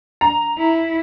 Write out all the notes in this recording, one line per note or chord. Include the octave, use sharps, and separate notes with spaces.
A#5
E4